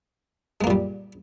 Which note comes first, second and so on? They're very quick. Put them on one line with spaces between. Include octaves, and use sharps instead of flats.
G#3 A#3 A#2 G3